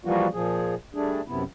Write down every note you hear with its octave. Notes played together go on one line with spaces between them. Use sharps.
E3 F3 G3 A#3 F4 F#4
A#2 F3 G#4
G3 A3 D4 G#4
F#2 C3 B3 E4